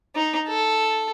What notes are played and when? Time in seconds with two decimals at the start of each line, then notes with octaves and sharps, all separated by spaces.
0.15 D#4
0.48 A4